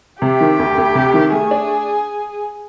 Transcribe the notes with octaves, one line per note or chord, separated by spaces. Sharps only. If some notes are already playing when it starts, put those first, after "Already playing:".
C3 G4
D#3
D2
D2
C3
D#3
A3 G#4
D4